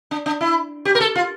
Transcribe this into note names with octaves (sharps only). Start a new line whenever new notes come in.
D4
D4
E4
G4
A#4
A4
F4